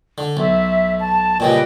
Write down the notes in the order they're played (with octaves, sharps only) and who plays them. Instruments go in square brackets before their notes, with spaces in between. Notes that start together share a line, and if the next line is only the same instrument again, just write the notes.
[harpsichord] D3
[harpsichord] B1 [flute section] E5
[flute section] A5
[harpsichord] A#2 C#3 G3 [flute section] B4 D#5 G5